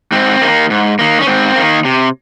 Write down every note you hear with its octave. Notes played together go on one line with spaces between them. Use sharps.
G#2 C4
D#3 A#3
G#2
D#3 A#3
C#4
G#2 C4
D#3 A#3
C3